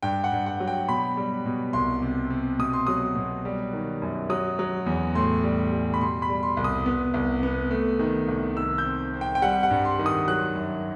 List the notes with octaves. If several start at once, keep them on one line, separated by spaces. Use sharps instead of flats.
G2 G5
F#5
G2
F#5
F#3
G5
B2 B5
G3
B2
C2 C6
C3
C3
B2 D#6
C6
F#3 D#6
B2
G3
D#3
F#2
F#3 D#6
F#3
E2
A2 C6
G3
G3
B5
B2 C6
B5
G3
C6
C2
D#6
B3
C2
B3
A3
D#3
C2
D#3 E6
G6
C4
C4
G5
G5
G3 F#5
F#5
G2
C6
D#3
D#6
F#3 F#6
F#2